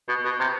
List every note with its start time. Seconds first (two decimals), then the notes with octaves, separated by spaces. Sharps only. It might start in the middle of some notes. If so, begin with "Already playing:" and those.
0.09 B2
0.25 B2
0.40 C3